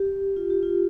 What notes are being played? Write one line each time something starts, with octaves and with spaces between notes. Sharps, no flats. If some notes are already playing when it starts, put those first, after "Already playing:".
Already playing: G4
F4
G4
F4